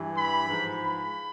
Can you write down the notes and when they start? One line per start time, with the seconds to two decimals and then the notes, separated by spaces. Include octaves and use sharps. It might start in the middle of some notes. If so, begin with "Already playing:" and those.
Already playing: G2 E3
0.18 B5
0.48 G#2 F3
0.78 B5